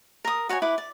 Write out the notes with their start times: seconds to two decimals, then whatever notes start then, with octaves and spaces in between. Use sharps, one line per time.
0.25 A#4 D#6
0.49 F#4 C#5 F#5 G#5
0.62 E4 B4 D6
0.78 D5